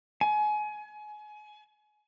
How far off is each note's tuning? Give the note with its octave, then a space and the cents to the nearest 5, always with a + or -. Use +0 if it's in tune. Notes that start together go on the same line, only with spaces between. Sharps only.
G#5 +30